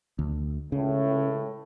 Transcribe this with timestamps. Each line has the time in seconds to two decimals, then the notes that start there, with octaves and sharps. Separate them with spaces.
0.19 D2
0.72 C#2 A2 C#3